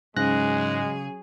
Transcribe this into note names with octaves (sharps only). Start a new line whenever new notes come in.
G#2 C#3 F#3 G#3 G#4 F#6 A#6